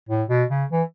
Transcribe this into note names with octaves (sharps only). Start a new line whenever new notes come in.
A2
B2
C#3
E3